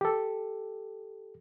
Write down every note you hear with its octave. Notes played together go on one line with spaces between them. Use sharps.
G4 A4